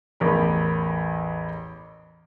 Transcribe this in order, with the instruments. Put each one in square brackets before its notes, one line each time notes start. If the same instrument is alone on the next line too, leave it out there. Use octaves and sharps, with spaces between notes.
[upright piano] A1 E2 A#4 B5